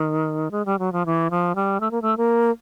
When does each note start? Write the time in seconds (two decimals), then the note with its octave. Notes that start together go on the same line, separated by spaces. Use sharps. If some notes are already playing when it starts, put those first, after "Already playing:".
Already playing: D#3
0.51 G#3
0.66 G3
0.79 F#3
0.93 F3
1.06 E3
1.31 F3
1.55 G3
1.80 A3
1.91 A#3
2.02 A3
2.17 A#3